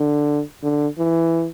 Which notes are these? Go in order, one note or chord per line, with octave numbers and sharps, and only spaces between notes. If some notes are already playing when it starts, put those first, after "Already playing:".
Already playing: D3
D3
E3